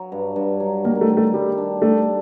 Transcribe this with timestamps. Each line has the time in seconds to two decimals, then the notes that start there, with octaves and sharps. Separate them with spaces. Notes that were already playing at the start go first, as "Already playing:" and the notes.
Already playing: F#3
0.12 G2
0.36 G2
0.60 F#3
0.84 D#3 A#3
1.01 A3
1.09 D#3
1.17 A3
1.33 G3 G4
1.58 D4
1.82 A3 D4